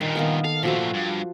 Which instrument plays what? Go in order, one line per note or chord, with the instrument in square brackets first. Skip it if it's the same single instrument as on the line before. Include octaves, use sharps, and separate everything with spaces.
[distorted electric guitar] G2 A#2 [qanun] D#3
[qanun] D#3 A#3 B3
[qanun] A4 [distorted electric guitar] F5
[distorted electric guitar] A#2 A3 [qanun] F3 F#4 C5
[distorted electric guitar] G2